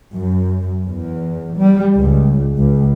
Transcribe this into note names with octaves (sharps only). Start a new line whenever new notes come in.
F#2
E2
G3
C#2
C#2